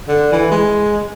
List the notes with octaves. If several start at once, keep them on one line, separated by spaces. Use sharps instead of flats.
D3
E3
G#3